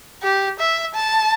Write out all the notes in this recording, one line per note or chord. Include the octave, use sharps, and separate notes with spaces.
G4
E5
A5